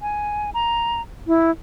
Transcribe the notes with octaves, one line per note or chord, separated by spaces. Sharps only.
G#5
A#5
E4